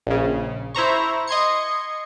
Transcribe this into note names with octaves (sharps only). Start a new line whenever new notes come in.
A#1 C#3
E4 C5 A#5 C#6
D#5 C6 G#6 C#7